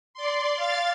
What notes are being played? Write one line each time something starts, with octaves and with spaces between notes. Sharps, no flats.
D5 C6
F5 A6